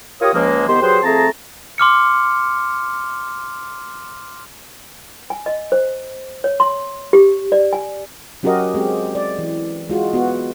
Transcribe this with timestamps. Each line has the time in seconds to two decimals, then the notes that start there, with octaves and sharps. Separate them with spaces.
0.21 F4 G4 A#4 C#5 D#6
0.34 C#2 F3 G#3 A#3
0.69 C2 D#3 B3 G4 C5
0.82 F#3 G4 G#4 B4 C5
1.04 F3 A3 C4 G#4 A5 A#5
1.78 C6 D6 F6 C#7
5.30 G#5
5.46 D#5
5.72 C5
6.44 C#5
6.60 C6
7.13 G4
7.52 D5
7.73 G#5
8.43 F#3 C#4 F#4 G4 A#4 D#5
8.74 G#3 C4 G4
9.15 D5
9.39 E3
9.90 G#3 F4 F#4
10.13 B3 F#4